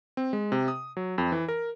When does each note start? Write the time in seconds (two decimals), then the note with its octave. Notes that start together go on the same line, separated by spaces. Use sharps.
0.17 C4
0.33 G#3
0.52 C3
0.68 D#6
0.97 F#3
1.18 F2
1.32 E3
1.48 A#4